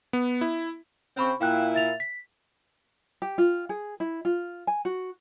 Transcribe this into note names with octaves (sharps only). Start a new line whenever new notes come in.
B3
E4
C#3 C4 C5 B5 C#6
A#2 A#3 E4 F5 G5 F#6
E5 A6 F7
B6
G4
F4
G#4
E4
F4
G#5
F#4